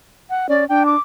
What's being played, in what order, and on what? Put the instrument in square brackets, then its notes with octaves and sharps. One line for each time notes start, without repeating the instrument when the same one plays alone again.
[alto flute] F#5
[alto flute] C#4 [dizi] D5
[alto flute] D4 [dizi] G5
[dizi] D6